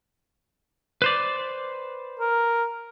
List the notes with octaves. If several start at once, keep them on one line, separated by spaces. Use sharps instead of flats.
B4 C5 D5
A#4